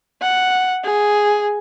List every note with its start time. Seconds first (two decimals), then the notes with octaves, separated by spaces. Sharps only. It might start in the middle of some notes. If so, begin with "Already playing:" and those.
0.22 F#5
0.84 G#4